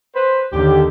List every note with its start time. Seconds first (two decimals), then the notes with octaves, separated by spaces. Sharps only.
0.15 B4 C5
0.53 D#2 D3 D#3 G4